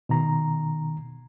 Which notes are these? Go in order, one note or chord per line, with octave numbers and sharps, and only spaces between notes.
B2 D#3 A#5